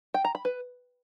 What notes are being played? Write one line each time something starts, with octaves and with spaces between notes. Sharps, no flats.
G5
A#5
B5
B4